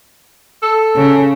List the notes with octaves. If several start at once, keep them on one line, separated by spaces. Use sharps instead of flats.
A4
C#3